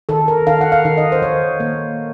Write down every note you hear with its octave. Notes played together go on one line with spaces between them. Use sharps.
D#3 A4
A#4
D#3 F5
F#5
F5
D#3
D#5
C5
D#3 C#5
A#3